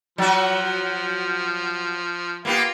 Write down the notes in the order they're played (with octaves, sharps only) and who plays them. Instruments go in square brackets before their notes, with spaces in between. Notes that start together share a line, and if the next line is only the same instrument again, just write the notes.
[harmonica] F3 [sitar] F#3 F#4
[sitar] A#3 B3 G4 [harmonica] F4